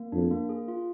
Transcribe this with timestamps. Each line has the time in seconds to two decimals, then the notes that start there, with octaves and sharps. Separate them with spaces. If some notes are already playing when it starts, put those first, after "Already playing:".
Already playing: A#3
0.12 F2 D4
0.31 A#3
0.49 G#4
0.68 F4